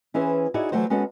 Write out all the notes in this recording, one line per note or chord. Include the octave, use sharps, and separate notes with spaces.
E3 C#4 E4 G#4 B4 C5
D#4 E4 F#4 G#4 C#5 D5
E3 F#3 A3 F#4 C5
G#3 B3 C#4 F#4 A4